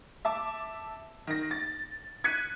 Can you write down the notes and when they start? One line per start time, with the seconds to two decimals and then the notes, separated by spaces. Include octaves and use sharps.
0.25 E5 A5 D6
1.27 D#3 A#6
1.51 A6
2.24 F#6 G#6 B6 C#7 D#7